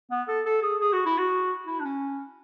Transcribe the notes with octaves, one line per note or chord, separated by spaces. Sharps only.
B3
A4
A4
G#4
G#4
F#4
E4
F#4
E4
D4
C#4